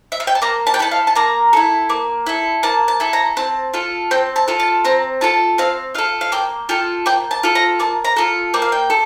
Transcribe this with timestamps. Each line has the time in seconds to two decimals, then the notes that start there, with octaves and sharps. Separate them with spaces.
0.12 E5
0.20 F5
0.27 G5
0.35 A5
0.42 A#3 A#5
0.67 A5
0.74 G5
0.79 E4 A4 A5
0.92 F5
1.07 A5
1.15 A#3 A#5
1.53 E4 A4
1.90 A#3
2.26 E4 A4
2.63 A#3 A5
2.88 A5
3.00 E4 A4
3.13 A#5
3.37 C4 A5
3.74 F4 A4
4.11 C4 G5
4.36 A5
4.48 F4 A4
4.60 A5
4.85 C4 A#5
5.21 F4 A4 A5
5.58 C4 F5
5.95 F4 A4 F5
6.21 F5
6.32 A#3 G5
6.69 F4 A4 G5
7.06 A#3 G5
7.31 A5
7.43 F4 A4
7.55 A#5
7.80 A#3 A5
8.05 A#5
8.16 F4 A4
8.54 A#3 G5
8.62 F5
8.72 G5
8.90 A4